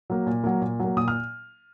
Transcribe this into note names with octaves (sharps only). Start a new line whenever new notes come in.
F#3 A#3
A#2
F#3 A#3
A#2
F#3 A#3
A#2 D#6
F6